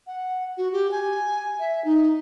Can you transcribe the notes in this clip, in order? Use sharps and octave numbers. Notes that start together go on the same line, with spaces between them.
F#5
F#4
G4
G#5
E5
D#4